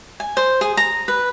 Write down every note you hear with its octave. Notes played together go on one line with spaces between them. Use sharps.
G#5
C5
G#4
A#5
B4